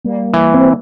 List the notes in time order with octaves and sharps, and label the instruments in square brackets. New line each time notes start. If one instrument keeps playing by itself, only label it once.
[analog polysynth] G3 A#3
[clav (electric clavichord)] E3
[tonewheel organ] C4